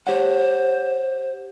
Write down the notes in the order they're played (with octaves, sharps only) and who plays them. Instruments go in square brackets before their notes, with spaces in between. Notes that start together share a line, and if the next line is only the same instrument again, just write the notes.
[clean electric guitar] G4 C#5 F#5 [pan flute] C5